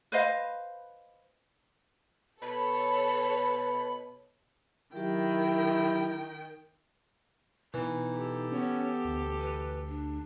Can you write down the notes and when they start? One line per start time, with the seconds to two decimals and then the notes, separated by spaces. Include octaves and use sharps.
0.12 B4 C5 D#5 F5
2.42 B2 A4 C#5 B5
4.95 D#3 F#3 E4 G4 G5
7.74 B2 E3 D#4
8.13 G4 A4
8.52 B3 C#4
9.05 D2
9.40 B4
9.88 D4